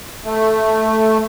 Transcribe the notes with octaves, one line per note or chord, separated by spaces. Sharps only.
A3